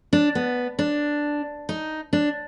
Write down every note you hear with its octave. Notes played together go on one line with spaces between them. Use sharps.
D4
B3
D4
D#4
D4